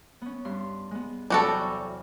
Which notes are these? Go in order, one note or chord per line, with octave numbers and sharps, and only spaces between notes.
B3 C#4
G2 C6
G#3 B3
E2 C3 F#3 G3 F#4 A4